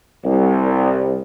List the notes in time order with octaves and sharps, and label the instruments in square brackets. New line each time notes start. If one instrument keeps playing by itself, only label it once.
[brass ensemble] C2